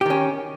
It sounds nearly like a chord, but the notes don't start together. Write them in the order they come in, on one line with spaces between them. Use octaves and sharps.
G4 D#3 C#4